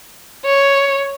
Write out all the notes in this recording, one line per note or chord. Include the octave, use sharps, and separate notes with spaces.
C#5